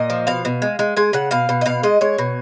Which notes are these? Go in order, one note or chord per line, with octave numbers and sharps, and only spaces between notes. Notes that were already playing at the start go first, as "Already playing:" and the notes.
Already playing: A#2 D#5
F3
B2 F5
B2
G#3
G#3
G#3 G#5
C#3 F#5
B2 F5
B2
D#5
B2 F5
G#3 D#5
G#3 C#5
B2